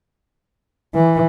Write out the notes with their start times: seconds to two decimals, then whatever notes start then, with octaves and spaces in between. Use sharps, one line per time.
0.95 E3